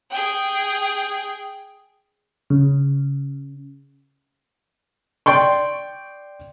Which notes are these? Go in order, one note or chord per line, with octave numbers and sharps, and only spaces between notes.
G#4 G5
C#3
D5 G5 C6 C#6